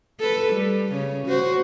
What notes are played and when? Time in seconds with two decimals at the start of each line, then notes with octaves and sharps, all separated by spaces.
0.20 A4 B4
0.53 G3
0.91 C#3 C#4
1.27 F#4 C5